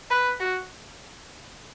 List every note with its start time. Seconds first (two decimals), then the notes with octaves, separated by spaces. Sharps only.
0.11 B4
0.40 F#4